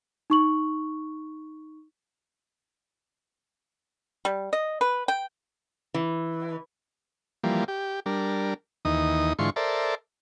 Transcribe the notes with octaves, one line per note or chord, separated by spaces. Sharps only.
D#4 C#6 F#7
G3
D#5
B4
G5
E3
E3 F3 G3 A#3
G4
G3 D4 A#4
D#2 E3 D#4 D#6
G#2 D3 E3 F4 C6 C#6
A4 A#4 C5 D5 E5